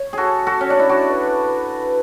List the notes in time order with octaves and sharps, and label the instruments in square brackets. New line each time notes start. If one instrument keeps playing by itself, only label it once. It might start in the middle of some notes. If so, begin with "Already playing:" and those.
Already playing: [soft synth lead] C#5
[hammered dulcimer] F#4 G#4 A4
F#4 A4
C#4
[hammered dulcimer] D4 [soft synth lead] D5
[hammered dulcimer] E4
[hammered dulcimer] D4 F#4 [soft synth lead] D5
[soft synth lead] B4